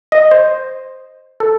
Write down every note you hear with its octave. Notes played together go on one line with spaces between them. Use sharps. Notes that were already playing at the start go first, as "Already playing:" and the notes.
D#5
C5
A4